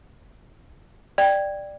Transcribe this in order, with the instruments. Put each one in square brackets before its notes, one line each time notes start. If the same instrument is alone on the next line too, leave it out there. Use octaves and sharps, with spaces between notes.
[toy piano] D5 [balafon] G5